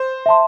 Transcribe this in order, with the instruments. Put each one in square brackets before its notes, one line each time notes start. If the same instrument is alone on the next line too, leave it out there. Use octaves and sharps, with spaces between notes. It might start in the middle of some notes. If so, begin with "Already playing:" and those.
Already playing: [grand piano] C5
[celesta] E5 A5 C6